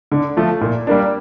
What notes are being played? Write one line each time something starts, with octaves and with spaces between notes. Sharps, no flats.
D3
F3 A3
A#2
G3 A#3 D4